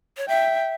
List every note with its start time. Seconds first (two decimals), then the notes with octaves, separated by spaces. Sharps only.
0.17 C#5
0.28 E5 G5